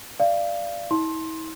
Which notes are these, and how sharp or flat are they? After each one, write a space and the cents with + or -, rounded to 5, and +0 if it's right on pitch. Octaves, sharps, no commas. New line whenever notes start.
D5 +0 F5 -25
E4 -45 C6 +15